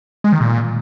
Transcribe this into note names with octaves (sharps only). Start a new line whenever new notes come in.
G#3
D#3
A#2